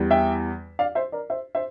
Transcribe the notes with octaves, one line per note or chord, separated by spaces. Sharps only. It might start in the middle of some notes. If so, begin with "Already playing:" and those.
Already playing: E2 E3 G3
E5 G5
D5 F5
C5 E5
A#4 D5
C5 E5
C5 E5